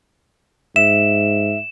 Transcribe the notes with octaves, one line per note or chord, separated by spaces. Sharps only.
G#2 E5 E7